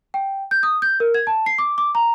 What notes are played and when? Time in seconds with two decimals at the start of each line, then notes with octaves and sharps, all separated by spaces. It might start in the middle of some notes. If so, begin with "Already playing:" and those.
0.14 G5
0.51 G6
0.63 D#6
0.82 G6
1.00 A#4
1.14 G#6
1.27 A5
1.46 C7
1.58 D6
1.78 D6
1.95 A#5